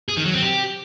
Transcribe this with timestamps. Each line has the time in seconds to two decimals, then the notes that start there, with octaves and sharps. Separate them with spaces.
0.08 G#4
0.17 D#3
0.25 F#3
0.34 C4
0.42 G4